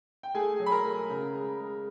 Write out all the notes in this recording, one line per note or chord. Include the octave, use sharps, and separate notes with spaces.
G5
A3 G#4 G#5
F#3
B5
A#4 A#5
A3
C#3
G#3
G#3